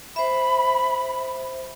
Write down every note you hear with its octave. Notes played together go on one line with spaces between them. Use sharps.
C5 E5 B5